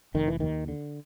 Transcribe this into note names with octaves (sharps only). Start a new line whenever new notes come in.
F1 D#3
E3
D#2 D#3
D3